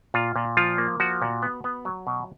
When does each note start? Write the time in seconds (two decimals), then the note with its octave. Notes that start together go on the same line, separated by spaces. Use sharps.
0.14 A#2 F4
0.36 A#2
0.57 F3 F4
0.78 A#3
1.00 F3 F#4
1.22 A#2
1.42 B3
1.64 B3
1.85 F#3
2.07 B2